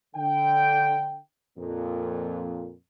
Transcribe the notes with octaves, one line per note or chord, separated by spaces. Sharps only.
D3 G5
F2 A#2